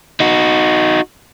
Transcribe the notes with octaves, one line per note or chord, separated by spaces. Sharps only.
D#4 F#4